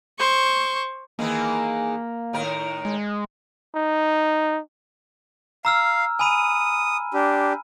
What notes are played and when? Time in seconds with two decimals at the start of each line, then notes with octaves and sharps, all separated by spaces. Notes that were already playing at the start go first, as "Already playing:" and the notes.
0.19 C5 C#6
1.19 D#3 E3 G#3 A#3
2.33 A2 D#3 A#4
2.85 G#3
3.75 D#4
5.65 F5 A#5 E6 F6
6.19 G#5 B5 D#6 D#7
7.14 D4 G4